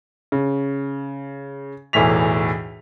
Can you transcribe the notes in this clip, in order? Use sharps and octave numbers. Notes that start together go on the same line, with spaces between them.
C#3
B1 E2 A2 E3 B6 F7